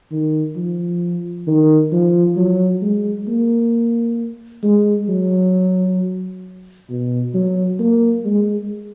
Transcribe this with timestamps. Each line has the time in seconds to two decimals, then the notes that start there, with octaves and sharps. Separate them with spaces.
0.11 D#3
0.56 F3
1.47 D#3
1.92 F3
2.37 F#3
2.82 G#3
3.28 A#3
4.63 G#3
5.09 F#3
6.89 B2
7.34 F#3
7.79 A#3
8.25 G#3